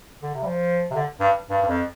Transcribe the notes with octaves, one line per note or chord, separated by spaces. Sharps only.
D3
C3
G3
F3
C3
D3
G2
G2
G2
F2